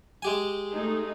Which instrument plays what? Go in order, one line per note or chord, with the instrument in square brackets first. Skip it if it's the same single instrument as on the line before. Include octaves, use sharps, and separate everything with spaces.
[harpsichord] G#3 G4 G#5
[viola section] A3 D#4 G#4